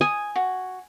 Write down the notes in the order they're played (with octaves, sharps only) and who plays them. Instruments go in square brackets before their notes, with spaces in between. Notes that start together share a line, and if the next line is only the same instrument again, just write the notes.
[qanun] G#5 [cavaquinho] D#6
[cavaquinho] F#4